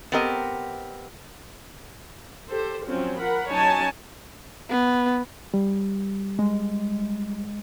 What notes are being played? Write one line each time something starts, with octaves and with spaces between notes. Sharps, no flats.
B3 C4 G4 A#4 D#5
G4 A4 C5
F3 F#3 C4 C#4
A#4 F#5 B5
F#3 C#4 D#4 C#5 G#5 A5
B3
G3
G#3